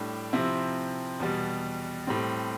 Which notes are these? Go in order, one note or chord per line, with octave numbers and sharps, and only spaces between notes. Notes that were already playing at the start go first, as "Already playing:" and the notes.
Already playing: A2 G3 D4
C3 F3 C4 E4
E2 B2 G3
A2 G3 C4